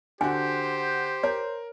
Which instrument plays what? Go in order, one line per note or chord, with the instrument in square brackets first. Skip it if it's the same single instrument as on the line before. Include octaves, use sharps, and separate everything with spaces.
[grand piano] D3 F#4 [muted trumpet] G4 [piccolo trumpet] C5 [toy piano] G#5
[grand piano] A#4 [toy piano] C#5